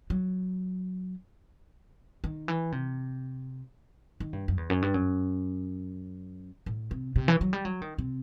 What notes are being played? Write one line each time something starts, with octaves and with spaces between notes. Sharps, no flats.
F#3
D#3
E3
C3
D#3
G2
F#2
E2
F#2
G2
F#2
A2
C3
C3
E3
F#3
G3
F#3
D#3
C3